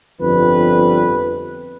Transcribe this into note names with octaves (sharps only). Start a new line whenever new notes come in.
G1 F2 G3 B4